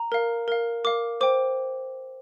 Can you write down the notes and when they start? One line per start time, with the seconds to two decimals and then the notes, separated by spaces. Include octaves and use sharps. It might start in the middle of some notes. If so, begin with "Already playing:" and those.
Already playing: A#5
0.12 A#4 F5
0.48 A#4 F5
0.84 A#4 F5 D6
1.21 C5 G5 D6